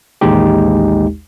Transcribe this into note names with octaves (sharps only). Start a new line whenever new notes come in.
A1 D#2 G#3 D#4 G4